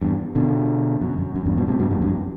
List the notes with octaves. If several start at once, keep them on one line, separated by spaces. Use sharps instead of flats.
E2 G2
B2 D3
F#2
F#2
F#2
E2 G2
G2 B2
A2 C3
G2 B2
F#2 A2
E2 G2
F#2